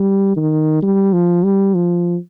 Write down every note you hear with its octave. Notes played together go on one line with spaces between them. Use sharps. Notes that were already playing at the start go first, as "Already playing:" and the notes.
Already playing: G3
D#3
G3
F3
G3
F3